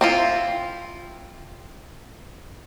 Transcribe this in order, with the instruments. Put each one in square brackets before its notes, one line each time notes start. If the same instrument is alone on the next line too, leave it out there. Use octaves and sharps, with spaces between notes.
[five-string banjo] C4 E4 F4